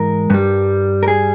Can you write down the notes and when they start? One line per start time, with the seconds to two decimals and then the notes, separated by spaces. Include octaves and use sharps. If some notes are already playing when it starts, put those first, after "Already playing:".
Already playing: G#2 E3 G#3 A#4
0.30 G2 G3
1.03 A#4
1.08 G#4